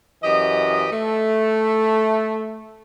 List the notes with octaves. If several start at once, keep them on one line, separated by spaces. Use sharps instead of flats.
F#2 E3 G4 D#5
A3